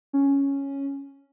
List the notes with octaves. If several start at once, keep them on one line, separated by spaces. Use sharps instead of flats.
C#4